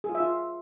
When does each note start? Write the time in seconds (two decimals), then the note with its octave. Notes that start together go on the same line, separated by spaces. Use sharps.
0.04 G#4
0.09 F4
0.15 E5
0.20 F4